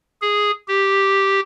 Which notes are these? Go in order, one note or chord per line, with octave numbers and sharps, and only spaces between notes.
G#4
G4